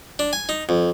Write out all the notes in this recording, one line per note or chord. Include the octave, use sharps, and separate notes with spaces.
D4
G#5
D#4
F2